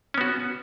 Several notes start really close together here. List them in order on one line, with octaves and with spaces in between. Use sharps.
C#4 B3 F#4